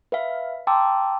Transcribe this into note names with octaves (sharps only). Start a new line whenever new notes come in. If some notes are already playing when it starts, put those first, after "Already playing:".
B4 E5 F5
G5 A5 A#5 C6 D6 E6